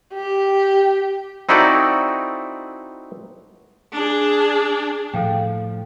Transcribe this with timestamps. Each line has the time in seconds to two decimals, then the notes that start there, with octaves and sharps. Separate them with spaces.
0.14 G4
1.49 C4 D#4 E4 F#4 A4 D5
3.93 D4 G#4
5.14 A2 F3 A4 F5 G5